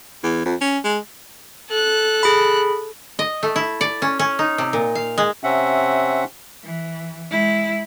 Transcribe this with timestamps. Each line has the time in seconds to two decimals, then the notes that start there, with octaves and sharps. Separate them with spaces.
0.24 E2
0.45 F2
0.61 C#4
0.84 G#3
1.69 A4 F#6
2.23 G#4 B5
3.19 D#5
3.43 A3
3.56 E4
3.81 D5
4.02 C#4
4.19 C#4
4.39 D#4
4.58 C3
4.73 A#2
4.95 F5
5.18 G#3
5.44 C3 C4 C#4 E5 F#5
6.63 E3
7.31 G#3 E4